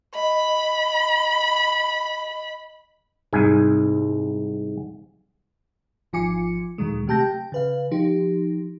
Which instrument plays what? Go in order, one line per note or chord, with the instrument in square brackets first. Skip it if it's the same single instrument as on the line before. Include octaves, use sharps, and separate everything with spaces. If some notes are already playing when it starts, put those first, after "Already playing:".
[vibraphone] D#5 [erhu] B5
[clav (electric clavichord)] C2 G#2 G#5
[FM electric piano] G#1 F3 F4 G#5 D6 C#7
D2 A#2 D#3 F#3 G#3
C3 A3 G4 A5 G6 A#6
G5
C#3 B4 F5
F3 D#4 G4